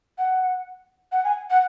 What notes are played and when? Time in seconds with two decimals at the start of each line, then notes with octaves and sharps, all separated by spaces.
0.18 F#5
1.12 F#5
1.24 G#5
1.51 F#5